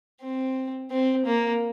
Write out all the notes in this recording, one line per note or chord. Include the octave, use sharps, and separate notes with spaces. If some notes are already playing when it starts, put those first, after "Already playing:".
C4
C4
A#3